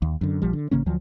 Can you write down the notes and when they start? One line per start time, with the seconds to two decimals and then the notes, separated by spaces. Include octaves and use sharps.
0.02 D#2
0.21 F#2 D3
0.42 A#1 F3 G3
0.53 D3
0.71 A1 C#3 A#3 C#4
0.86 D2 F3 F#3